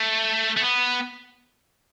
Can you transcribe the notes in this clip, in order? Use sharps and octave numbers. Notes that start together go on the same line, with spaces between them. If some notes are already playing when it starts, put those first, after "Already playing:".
Already playing: A3
A3
B3